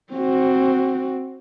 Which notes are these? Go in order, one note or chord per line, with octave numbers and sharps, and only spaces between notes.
C4 F#4